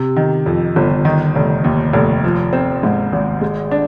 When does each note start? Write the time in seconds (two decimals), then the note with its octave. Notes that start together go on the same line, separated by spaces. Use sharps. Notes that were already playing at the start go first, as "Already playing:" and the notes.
Already playing: C3
0.16 D#3
0.46 F2
0.76 G1
1.05 D#3
1.35 F1
1.64 D#2
1.93 F1
2.24 F3
2.53 C4
2.83 G#2
3.12 G#1
3.41 G#3
3.71 D4